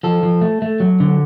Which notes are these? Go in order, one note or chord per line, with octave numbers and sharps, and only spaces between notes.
F3 A4
F3
A3
A3
F#3
D3